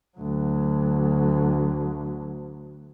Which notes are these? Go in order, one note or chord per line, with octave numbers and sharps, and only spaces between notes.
D2 F#3